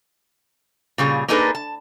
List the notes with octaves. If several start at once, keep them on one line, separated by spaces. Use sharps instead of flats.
A#2 C#3 G3 G#4
A#3 D4 D#4 G#4 A4 B4
A5